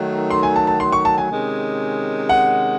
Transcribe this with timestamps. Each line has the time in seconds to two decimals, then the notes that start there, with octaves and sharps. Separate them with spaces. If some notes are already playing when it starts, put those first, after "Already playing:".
Already playing: D#3 F#3 A3
0.31 C6
0.43 G#5
0.56 A5
0.67 A5
0.80 C6
0.92 C#6
1.05 A5
1.18 G#5
1.30 C3 D#3 G#3 C#4
2.29 F#5